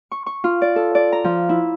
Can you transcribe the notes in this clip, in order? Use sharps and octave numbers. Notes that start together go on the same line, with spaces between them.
C#6
C#6
F4
D5
A4
D5
A#5
F3
E4